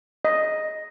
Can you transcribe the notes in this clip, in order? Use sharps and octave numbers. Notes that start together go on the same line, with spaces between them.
D#5